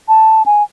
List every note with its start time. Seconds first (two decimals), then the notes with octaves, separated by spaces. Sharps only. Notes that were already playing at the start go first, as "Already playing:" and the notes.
0.08 A5
0.46 G#5